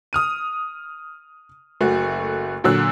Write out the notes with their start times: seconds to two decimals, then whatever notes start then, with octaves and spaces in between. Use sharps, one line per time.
0.13 D#6 F6 D#7
1.81 F#1 A3 F#4
2.64 A#2 D3 F#3 E6 F#6